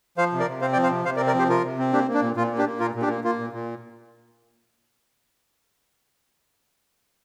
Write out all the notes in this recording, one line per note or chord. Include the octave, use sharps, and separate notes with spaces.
F3 C5 F5
C3
A#4 D5
C3
C4 C5 F5
D5 G5
F3
C5 F5
C3
C3 C5 F5
A#4 D5
C4
A#4 D5
F3 G4 C5
C3 F4 A#4
C3
C4
A#3 D4 G4
A#3
D4
A#2
A#2 F4
A#3
D4 G4
A#3
A#2 F4 A#4
A#2
D4 G4
A#3
A#3 F4
A#2
A#2